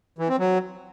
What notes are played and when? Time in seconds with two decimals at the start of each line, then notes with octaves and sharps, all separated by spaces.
0.18 E3
0.29 C4
0.39 F#3